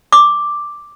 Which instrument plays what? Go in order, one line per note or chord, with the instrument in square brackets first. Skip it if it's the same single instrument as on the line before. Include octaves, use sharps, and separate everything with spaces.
[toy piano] D6